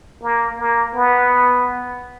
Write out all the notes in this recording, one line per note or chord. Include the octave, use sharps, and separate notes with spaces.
A#3
A#3
B3